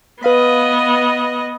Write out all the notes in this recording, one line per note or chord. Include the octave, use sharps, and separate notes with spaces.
B3 B4 D#5 F5 B5